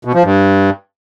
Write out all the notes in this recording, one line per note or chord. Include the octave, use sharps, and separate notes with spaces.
B2
F3
G2